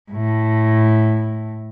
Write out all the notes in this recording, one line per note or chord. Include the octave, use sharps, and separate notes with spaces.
A2